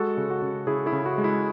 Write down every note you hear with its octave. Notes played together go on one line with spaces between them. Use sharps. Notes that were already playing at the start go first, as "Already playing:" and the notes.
Already playing: G#3 F#4 A4
C#3
F#4
C#3
C#3 E4 G#4
E4 G#4
C#3
F#4
G#3
E4